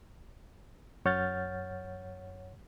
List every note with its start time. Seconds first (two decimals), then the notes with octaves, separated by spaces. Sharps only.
1.05 F#2 C#5 F#5 F6 G6 A6